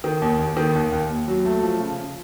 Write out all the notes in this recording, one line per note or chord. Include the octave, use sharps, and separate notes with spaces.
D#3
D#2
D#2
D#3
D#2
D#2
D#2
F#3
A3
F3
C#3
C#3